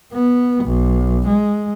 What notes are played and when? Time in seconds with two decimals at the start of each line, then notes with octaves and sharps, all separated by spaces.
0.12 B3
0.65 B1
1.28 G#3